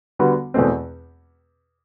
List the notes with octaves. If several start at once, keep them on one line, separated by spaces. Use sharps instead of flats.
D3 G3 B3 F#4
E2 B2 A3 C4